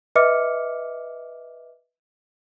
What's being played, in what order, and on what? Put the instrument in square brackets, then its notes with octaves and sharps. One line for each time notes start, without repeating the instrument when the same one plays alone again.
[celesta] B4 D#5 E5 D6 F6 C#7